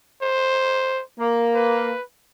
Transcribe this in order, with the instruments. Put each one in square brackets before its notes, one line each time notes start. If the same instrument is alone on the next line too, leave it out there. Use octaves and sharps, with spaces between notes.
[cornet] C5
[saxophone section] A#3
[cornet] B4